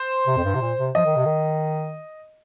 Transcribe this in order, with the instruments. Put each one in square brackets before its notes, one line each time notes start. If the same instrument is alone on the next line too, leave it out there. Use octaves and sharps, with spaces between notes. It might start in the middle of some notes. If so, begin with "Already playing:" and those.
Already playing: [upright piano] C5
[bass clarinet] C3
F2
G2
C3
A#2
C3
[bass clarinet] F3 [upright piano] D#5
[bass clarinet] D#3
C3
D#3